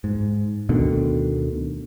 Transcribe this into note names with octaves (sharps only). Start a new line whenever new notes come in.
G#2
D2 B2 D3 D#3